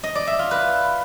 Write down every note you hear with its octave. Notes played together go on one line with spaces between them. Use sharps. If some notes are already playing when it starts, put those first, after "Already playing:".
D#5
D5
E5
F4
B4